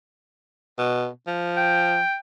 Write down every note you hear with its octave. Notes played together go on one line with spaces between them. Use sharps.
B2
F3
G5